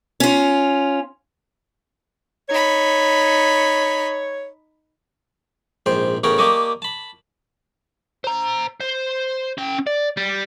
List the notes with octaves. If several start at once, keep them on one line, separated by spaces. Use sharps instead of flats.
C#4 F4
D#4 C#5 B5
A#1 G#2 C5 G5
A1 C#3 B3 A#4 C#5 G5
A#3 G4 D5 D#5 A5 C#6
A5 B5
C5 A#5
C5
C#4 G5
D5
G3